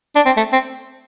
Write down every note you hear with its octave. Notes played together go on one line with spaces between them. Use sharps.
D4
C4
A3
C4